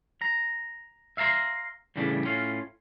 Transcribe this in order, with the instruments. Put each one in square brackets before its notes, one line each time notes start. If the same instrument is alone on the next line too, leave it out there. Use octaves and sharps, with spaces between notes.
[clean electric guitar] A#5
E5 F5 A5 A#5 C6
E2 A2 C#3 G3 D4
A2 C#4 F4 F5